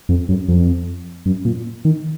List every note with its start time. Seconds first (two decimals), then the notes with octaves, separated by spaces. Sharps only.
0.09 F2
0.29 F#2
0.48 F2
1.26 F#2
1.45 A#2
1.85 D#3